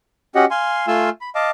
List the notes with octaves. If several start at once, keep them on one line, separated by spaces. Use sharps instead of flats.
C#4 F#4 G4 D#5 F#5
F5 G#5 C6
A3 F4 F5 G#5 C6 E6
B5
D#5 F5 A5 D6